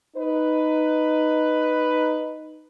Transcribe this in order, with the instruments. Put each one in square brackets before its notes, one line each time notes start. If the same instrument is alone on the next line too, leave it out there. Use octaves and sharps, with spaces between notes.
[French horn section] D#4 B4